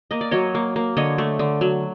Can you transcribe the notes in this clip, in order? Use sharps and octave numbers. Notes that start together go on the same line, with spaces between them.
A#3 D#5
D5
F#3 C#5 D#5
A#3
A#3
D3 C#5 D#5
A3
D3
F#3